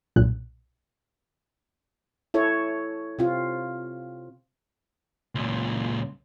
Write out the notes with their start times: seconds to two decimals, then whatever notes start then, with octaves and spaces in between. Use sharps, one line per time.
0.16 B1 G2 A#2 F#6
2.34 E4 A4 C#5
3.19 C3 C4 F4
5.35 C#2 A#2